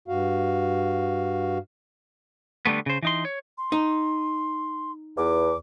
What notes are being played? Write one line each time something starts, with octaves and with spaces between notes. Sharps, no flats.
G2 F#4 F5
D3 G3 A3 B3
C#3 C5
E3 D#4 C6
C#5
C6
D#4
E2 D6